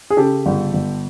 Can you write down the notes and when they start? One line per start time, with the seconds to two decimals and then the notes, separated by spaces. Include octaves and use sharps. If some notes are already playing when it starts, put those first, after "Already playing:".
0.10 G#4
0.17 C#3 G4 A4
0.46 G1
0.73 G1